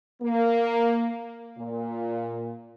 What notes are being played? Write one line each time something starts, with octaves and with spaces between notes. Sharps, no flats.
A#3
A#2